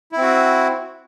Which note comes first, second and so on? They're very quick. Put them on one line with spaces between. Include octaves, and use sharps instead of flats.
E4 C4 F#4